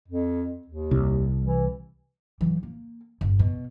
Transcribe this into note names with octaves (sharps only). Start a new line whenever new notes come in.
F2
D#2
C2
E3
E3 F#3
A#3
G1
B2